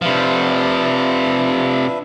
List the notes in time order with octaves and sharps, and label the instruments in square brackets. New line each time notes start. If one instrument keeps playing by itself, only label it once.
[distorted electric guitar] C3 F3 [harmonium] D4 B4 E5